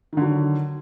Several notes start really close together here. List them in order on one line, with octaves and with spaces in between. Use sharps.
D#3 D3 F#3